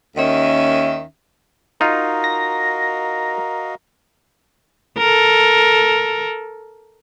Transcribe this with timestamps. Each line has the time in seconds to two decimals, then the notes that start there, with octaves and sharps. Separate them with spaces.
0.16 D#2 D#3 C#4 E5
1.81 D#4 F4 F#4 A#4 D#5 F5
2.24 A#6
4.98 A4 A#4